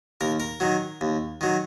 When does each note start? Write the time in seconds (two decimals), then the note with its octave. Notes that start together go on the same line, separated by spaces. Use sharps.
0.21 D#2 A#4
0.40 A#4
0.60 D#3 F#3
1.01 D#2
1.41 D#3 F#3